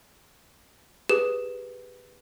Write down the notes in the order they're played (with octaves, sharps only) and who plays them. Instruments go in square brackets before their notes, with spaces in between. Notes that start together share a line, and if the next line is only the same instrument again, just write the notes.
[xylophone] G4 G#4 B4 E7